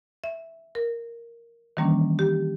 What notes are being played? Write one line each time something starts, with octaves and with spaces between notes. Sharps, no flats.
E5
A#4
D#3 E3 G3 A#3 C#4 D4
G4